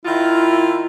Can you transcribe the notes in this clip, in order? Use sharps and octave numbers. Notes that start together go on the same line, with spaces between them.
D#3 E4 F4